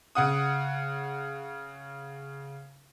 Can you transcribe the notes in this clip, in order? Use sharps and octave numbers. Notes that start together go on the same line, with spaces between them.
C#3 F#5 D#6